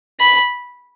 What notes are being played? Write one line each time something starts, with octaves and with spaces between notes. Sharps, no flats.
B5